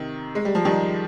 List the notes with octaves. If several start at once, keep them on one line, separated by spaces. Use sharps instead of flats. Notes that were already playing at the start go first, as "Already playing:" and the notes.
Already playing: C3 D#3
G#3
G3
F3
D#3 G3